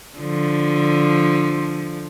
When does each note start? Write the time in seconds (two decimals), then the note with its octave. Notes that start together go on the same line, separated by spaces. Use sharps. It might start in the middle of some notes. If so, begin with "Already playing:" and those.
0.18 D3 F3